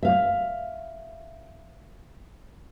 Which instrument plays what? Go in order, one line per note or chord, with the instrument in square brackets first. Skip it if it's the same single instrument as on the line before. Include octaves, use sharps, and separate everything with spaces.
[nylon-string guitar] E5 F5